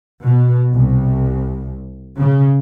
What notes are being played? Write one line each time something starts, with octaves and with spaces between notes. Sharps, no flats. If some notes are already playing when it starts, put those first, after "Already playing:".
B2
C2
C#3